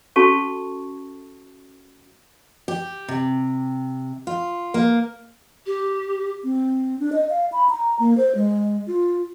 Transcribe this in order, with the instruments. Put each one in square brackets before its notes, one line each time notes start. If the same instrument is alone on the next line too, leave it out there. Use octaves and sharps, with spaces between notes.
[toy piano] C#4 F#4 A4 A5 C#6
[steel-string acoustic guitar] G4
C3
F4
A#3
[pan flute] G4
[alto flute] C4
D4
D#5
F5
B5
A#5
A#3
C5
G#3
F4